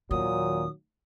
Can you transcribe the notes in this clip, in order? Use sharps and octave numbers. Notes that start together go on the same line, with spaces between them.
D#2 A#2 D#3 F#3 D#6